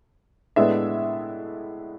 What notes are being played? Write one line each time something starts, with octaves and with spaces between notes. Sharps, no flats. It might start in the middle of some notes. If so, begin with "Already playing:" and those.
A2 G#3 B3 D4 E5